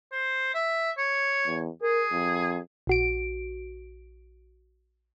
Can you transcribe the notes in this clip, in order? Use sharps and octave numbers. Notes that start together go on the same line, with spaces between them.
C5
E5
C#5
E2
G#4 A#4
F2
A#1 F#4 D7